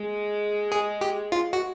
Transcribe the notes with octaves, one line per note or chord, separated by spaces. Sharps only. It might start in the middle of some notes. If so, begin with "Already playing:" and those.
Already playing: G#3
G#4
G4
F4
F#4